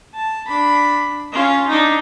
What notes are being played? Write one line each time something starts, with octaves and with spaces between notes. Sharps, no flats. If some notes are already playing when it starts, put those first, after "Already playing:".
A5
D4 B5
C#4 F4
D4 D#4